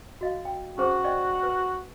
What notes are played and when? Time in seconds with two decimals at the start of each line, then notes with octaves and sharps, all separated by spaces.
0.21 F#4 D#5 F5
0.45 G5
0.78 C#4 F#4 G#4 C5
1.04 D5 D#5 G5
1.43 B4